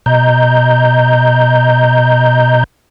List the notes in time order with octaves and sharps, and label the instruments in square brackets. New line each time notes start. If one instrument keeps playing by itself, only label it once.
[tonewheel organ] B2 D#5 A#5 G6